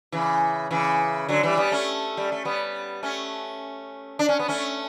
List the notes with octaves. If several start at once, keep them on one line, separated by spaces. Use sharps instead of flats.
C#3 E3
C#3 E3
D3 F#3
E3 G3
G3 B3
A3 C#4
G3
A3
G3 B3
A3 C#4
D4
C#4
B3
A3 C#4